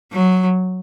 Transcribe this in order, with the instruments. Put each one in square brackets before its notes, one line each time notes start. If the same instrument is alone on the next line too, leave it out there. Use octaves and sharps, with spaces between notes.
[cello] F#3